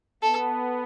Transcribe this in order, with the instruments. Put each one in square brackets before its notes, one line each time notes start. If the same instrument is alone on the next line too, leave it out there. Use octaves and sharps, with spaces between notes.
[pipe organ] B3 [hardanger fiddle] A4